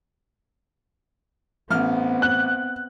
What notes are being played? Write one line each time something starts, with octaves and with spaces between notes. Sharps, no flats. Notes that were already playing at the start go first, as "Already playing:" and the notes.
A1 B3 C4 F6
F#6